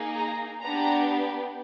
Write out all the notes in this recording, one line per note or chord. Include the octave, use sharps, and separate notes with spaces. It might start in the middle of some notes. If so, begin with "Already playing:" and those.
Already playing: A#3 D#4 G#4
A#5
B3 D4 G4 A#5